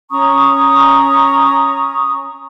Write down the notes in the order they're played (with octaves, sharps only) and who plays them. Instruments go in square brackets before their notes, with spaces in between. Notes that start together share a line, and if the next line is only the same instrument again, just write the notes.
[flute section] C#4 A#5 C#6 D#6